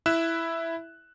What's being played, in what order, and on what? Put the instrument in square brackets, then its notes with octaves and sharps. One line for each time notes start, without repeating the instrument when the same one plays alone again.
[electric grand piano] E4 E5 F#6 E7